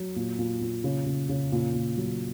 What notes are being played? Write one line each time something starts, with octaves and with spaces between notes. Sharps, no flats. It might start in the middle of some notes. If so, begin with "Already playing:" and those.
Already playing: F#3
A#2
A#2
A#2
C#3
C#3
C#3
A#2
A#2
F#3